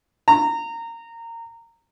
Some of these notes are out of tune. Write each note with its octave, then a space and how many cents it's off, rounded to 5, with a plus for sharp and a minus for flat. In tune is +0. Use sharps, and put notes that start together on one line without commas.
A#5 -20